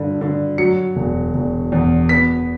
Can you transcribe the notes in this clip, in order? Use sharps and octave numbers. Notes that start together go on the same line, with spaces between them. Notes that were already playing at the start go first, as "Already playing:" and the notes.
Already playing: G2 D3
D3
F#3 C#7
E1
E1
E2
B3 B6